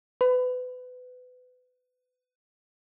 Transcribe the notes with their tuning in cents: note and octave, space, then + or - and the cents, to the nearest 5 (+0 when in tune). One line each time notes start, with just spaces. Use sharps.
B4 +30